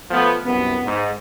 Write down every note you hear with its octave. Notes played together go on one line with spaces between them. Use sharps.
F3 A3 B3
C2 F#2 B3
G#2